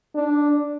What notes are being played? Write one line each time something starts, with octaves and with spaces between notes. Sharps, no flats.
D4